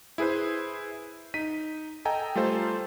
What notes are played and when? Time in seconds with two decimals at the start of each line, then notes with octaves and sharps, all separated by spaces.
0.18 E4 G#4 B4 C5
1.34 D#4 B6 D#7
2.05 A4 D#5 G5 G#5 A#5
2.35 G3 A3 F4 A4 C5